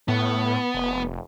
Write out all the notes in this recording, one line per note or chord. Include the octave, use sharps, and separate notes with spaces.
A2 B3
F1